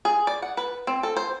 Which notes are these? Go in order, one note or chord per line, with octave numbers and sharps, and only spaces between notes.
G#4
D5
F#5
B4
C4
A4
C5